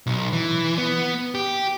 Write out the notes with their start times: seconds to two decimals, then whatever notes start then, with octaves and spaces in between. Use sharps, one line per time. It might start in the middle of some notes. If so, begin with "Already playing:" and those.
0.06 B1
0.33 E3
0.78 B3
1.35 G4